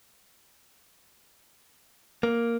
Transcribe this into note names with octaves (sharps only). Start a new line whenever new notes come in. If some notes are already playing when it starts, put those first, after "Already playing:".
A#3